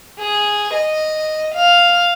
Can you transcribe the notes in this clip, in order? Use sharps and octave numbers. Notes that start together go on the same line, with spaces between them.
G#4
D#5
F5